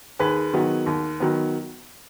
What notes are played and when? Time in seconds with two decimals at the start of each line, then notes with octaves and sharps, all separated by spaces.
0.19 D#2 G#4 B4
0.53 D#3 F#3 B3
0.86 D#2
1.20 D#3 F#3 B3